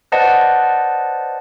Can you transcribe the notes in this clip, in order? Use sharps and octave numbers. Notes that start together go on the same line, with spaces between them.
B4 C5 D5 D#5 F#5 A5